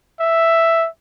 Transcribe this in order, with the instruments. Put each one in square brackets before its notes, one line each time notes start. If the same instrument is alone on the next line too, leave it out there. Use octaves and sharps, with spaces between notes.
[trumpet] E5